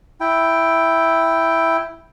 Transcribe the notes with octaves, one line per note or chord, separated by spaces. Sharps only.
E4 G5